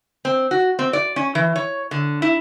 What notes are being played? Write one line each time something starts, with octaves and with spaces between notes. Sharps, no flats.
C4
F#4
C4
D5
C#4
E3
C#5
D3
E4